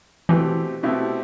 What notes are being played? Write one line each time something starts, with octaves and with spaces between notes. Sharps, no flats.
B2 E3 A3 C4 E4 G4
B2 A3 C4 E4 G4